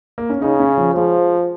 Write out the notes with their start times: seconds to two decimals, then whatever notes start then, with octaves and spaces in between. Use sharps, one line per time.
0.18 A#3
0.30 C#4
0.42 C#3 D#4
0.60 C#4
0.77 F3
0.95 F3 G#3